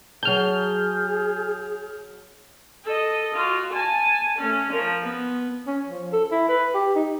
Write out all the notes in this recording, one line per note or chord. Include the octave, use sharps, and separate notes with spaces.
F#3 G#4 A5 F6 G6
A4 D#5
F4 F#4
G#5 A5
A3 C#4
F3 A#4
B3
C#4
F3
A4
E4
B4
G4
D#4